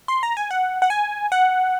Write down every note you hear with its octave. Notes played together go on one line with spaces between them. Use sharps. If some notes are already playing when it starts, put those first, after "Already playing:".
C6
A#5
G#5
F#5
F#5
G#5
F#5